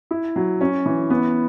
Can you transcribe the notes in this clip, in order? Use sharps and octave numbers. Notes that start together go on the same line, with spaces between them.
E4
F#3
C#4
E3
B3